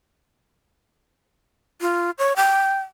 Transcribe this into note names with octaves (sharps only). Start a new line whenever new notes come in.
F4
C#5
G5